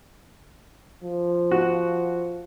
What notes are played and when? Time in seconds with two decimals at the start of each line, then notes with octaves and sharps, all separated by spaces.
1.04 F3
1.51 F#4